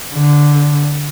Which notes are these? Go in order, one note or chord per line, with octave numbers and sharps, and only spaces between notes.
D3